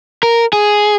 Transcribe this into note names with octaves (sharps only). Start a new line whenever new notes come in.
A#4
G#4